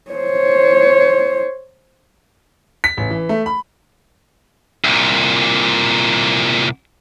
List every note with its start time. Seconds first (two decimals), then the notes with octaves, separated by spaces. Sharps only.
0.11 C5 C#5
2.84 B6
2.97 A1
3.11 E3
3.29 A3
3.46 B5
4.85 C2 A#2